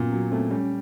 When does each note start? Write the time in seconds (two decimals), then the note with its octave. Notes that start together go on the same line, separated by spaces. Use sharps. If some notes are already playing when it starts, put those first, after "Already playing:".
Already playing: A#2 F#3 B3 C#4
0.12 F#3
0.31 A3 C4
0.51 G3 C#4